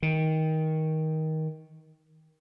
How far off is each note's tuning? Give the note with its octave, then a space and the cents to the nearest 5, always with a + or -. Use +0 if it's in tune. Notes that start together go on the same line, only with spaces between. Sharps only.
D#3 +20